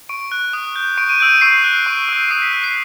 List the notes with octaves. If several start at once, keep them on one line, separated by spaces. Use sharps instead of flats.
C#6 D7
F#6
D#6
G6
C#6 D7
D#7
E6 G6 D7
C#6 C7
F#6
C#6
E6 G6
D#6 C7
B6
F#6
C7